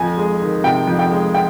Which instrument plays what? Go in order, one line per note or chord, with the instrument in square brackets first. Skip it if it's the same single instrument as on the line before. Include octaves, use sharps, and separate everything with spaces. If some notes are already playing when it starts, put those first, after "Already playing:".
Already playing: [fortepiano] F2 [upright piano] G#5
[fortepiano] G#3
D#3
[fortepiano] C3 [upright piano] G5
[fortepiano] F2
[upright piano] G5
[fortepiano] G#3
[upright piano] G5